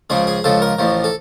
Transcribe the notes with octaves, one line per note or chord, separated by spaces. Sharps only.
C#2 C#3 F3 G#4
G#4
C#2 C#3 F3 A4
A#4
A1 A2 F3
A4